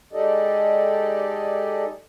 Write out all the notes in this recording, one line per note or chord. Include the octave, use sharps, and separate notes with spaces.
G#3 D#4 G4 A4 D5 D#5